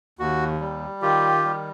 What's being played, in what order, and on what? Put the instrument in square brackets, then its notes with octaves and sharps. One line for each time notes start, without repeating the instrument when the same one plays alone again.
[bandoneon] D#2 F#4
G3
D#3 F4 G4
G3